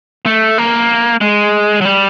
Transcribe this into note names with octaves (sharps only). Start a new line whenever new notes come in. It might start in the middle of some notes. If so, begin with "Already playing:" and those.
A3
A#3
G#3
F#3
G3